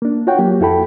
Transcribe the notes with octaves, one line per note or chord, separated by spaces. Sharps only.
A#3 D4
F4 F#4 C#5 F#5 G5
F#3 A#3 G4
F2 E4 F#4 A4 G5 B5